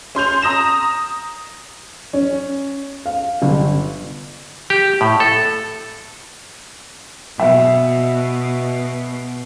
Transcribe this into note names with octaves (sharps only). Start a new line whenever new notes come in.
C#4 C6 G6 F7
A#5 D#6 A#6 E7
C#4
F5
G1
G4
A2
A4
B2 E5